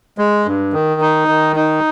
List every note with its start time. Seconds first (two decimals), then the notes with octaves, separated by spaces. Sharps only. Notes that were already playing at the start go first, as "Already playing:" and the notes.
0.18 G#3
0.46 G2
0.73 D#3
1.01 D#4
1.28 D#3
1.56 D#4